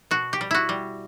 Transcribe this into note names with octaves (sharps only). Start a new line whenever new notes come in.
B2 F#4
G4
G3
E4 F#4
G3